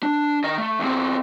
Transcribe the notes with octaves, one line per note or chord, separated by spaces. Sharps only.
D4
D#3 D#5
A3
E2 C4